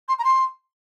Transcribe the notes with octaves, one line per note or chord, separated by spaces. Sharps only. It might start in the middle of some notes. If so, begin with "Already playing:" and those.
C6
A#5
C6